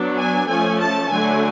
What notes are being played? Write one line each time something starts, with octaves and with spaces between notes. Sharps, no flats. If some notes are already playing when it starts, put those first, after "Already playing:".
Already playing: F#3 B3 D4
G#5
F3 A3 C#4 G#5
A5
D3 F#3 A3 G#5